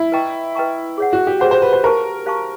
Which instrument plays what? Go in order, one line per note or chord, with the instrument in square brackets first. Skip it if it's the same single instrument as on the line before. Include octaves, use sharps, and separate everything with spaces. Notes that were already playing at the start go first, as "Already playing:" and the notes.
Already playing: [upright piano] E4
[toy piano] B4 D#5 G5 A#5 C#6
B4 D#5 G5 A#5 C#6
G#4 C#5 F#5
[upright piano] F#4
G4
[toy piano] G#4 C#5 F#5 [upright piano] C5
[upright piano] C5
B4
C5
[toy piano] G4 C5 F5 A5 C#6 [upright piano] A#4
[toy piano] G4 C5 F5 A5 C#6